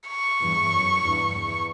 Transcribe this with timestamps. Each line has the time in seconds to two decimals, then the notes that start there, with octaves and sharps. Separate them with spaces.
0.08 C#6
0.40 E2 G2
0.71 F#2
1.03 E2 G2
1.35 E2